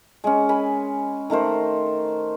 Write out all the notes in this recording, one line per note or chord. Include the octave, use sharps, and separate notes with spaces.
G#3 C#4
G#5 B5
D#3 A3 A#4 C5